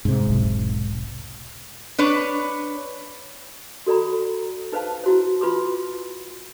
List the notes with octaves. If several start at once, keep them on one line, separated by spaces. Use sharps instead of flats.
C2 G#2 C3
E1 B1
D4 B4 C#5
F#4 A4 D5 A#5 B5
D#4 B4 C5 F5 A5
E4 F#4 C5
F4 B4 C6 D6